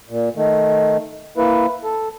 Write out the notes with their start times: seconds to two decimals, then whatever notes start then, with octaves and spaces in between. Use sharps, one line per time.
0.10 A#2
0.36 D#3 A3
1.37 A#3 E4 B4
1.84 A4